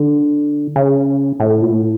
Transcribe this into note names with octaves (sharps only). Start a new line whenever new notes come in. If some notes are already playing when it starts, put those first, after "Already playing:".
Already playing: D3
C#3
A2
A#2
A2